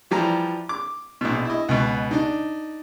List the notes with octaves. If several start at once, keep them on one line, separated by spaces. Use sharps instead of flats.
E3 F3 G3 A#5
D6
A#1 B2
E4 D#5
C#2 B2
D4 D#4